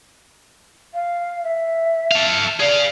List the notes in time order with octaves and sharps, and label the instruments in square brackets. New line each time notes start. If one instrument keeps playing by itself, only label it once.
[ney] F5
E5
[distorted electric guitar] A4 F5
[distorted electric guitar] G#4 F5 [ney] D5